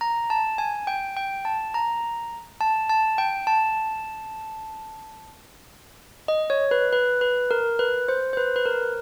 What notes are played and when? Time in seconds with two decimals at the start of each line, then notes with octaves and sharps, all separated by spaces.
0.01 A#5
0.30 A5
0.58 G#5
0.87 G5
1.17 G5
1.45 A5
1.74 A#5
2.61 A5
2.89 A5
3.18 G5
3.47 A5
6.28 D#5
6.50 C#5
6.71 B4
6.93 B4
7.21 B4
7.51 A#4
7.79 B4
8.08 C5
8.33 C5
8.37 B4
8.56 B4
8.65 A#4